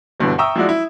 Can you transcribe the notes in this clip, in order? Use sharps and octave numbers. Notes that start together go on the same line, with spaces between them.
G1 G2 B2 D3 E3
E5 G5 A#5 C#6 D#6 E6
F3 F#3 G#3 E4 F#4 D5
E4